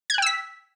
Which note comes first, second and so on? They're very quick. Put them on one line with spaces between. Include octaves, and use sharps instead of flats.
G#6 F#6 G5 E6 B6